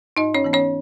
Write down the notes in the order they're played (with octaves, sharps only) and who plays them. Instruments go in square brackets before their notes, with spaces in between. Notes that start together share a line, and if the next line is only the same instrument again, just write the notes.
[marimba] G#2 D#4 D#5
C#4 C#5
E3 B3
C#4 C#5